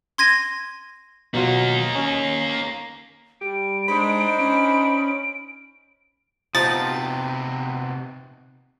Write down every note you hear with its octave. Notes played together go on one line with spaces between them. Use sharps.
C6 G#6 A#6 D#7
B2 F#3 A#3 D#4 F4
C#4
G3 D7
G#3 D4 D#4 C5 B5
C#4
C3 F3 B3 D#4 A6